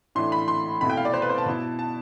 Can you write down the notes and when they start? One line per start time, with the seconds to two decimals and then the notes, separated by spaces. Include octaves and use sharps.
0.15 A2 E3 A3 D4 C6
0.32 B5
0.48 C6
0.81 C2 B2 A3 E4 B5
0.90 G5
0.97 F5
1.05 D5
1.14 C5
1.22 B4
1.30 C5
1.38 A5
1.46 B2 B3 E4
1.79 A5